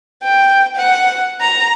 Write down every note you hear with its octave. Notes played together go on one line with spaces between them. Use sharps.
G5
F#5
A#5